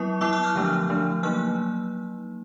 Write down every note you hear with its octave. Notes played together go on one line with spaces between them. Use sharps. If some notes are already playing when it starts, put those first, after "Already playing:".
Already playing: F#3 B3 E4 C#6 D#6
F#3 B3 E4 D6 E6
E6 F#6
F6 G6
D3 F3 A3 D4
D3 F3 A3 D4
F#3 A#3 D#4 E6 F#6